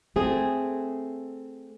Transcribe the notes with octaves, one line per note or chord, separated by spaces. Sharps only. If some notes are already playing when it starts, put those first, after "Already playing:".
A3 C4 G#4